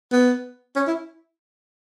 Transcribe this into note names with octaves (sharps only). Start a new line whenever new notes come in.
B3
C#4
E4